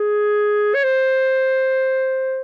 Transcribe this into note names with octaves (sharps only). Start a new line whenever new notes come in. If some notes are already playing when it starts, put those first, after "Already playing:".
Already playing: G#4
C#5
C5